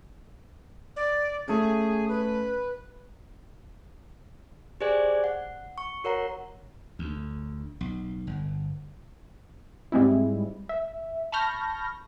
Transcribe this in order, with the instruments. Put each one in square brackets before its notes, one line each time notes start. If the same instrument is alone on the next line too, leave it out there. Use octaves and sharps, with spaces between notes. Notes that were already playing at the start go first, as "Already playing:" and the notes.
[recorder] D5
[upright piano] A3 C#4 [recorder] G#4
[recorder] B4
[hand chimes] G4 G#4 C5 D5 G#5
F#5
C#6
F#4 A#4 C#5 F#5 A#5
[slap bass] D2
B1
G1
[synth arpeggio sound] G#2 G3 G#3 C4 E4
E5
A5 B5 C#6 F6 G6 A#6